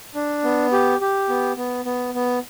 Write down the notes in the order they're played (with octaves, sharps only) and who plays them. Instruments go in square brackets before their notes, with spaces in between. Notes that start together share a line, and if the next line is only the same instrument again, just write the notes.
[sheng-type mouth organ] D4
B3
G4
G4
B3
B3
B3
B3